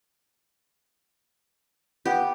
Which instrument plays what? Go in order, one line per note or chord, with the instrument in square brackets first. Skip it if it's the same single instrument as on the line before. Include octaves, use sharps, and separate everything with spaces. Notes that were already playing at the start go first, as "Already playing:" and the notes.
[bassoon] B3 [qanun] G4